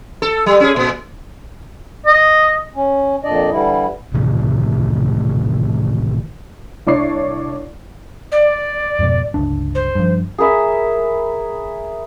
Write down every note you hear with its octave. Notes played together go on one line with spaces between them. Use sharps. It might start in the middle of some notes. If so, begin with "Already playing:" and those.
A4
G3
C#4 G#4
A#2
D#5
C#4
F2 A#2 D4 D5 D#5
D3 E3 G3 E4
A2 C3 D#3 E3
C2 D4 C#5 D5 C#6 C7
D5
F2 G#2 B2
G1 C#2 D4
C5
G2 F3
G#4 A#4 B4 E5